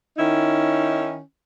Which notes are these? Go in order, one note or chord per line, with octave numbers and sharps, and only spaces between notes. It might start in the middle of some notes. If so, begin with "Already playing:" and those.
D#3 C#4 D#4 E4